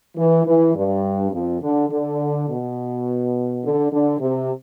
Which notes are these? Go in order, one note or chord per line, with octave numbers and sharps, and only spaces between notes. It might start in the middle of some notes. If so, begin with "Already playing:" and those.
E3
E3
G2
F2
D3
D3
B2
D3
D3
C3